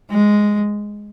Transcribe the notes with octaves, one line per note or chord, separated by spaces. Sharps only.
G#3